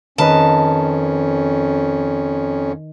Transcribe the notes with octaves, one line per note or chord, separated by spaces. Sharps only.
F2 D#3 C#4 B4 D#5 A5